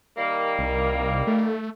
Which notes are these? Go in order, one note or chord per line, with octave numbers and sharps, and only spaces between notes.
D#3 G3 A#3
C2
A3